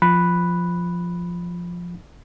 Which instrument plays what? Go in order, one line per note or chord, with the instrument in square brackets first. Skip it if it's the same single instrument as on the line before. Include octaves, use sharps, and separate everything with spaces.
[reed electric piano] F3 B5 F#6